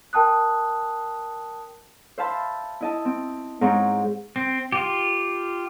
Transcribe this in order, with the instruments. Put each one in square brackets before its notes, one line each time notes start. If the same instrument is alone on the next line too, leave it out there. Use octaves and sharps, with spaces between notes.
[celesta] A#4 G5 A5 D#6 F#6
[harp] C5 E5 F5 A5 B5 C6
E4 D#5 A5
C4
G#2 C4 C#5 A#5
[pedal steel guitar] C4
F4 G4